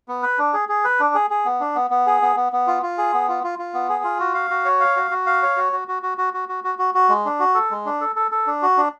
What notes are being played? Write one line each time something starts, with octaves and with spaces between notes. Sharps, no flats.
B3
B4
D4
G#4
G#4
B4
D4
G#4
G#4
B3
D4
B3
B3
G#4
B3
B3
B3
F4
F4
G#4
B3
F4
F4
F4
B3
G#4
F4
F#4
F5
F#4
C#5
F5
F#4
F#4
F5
C#5
F#4
F#4
F#4
F#4
F#4
F#4
F#4
F#4
F#4
F#4
G#3
D4
F#4
A4
G#3
D4
A4
A4
A4
D4
F#4
D4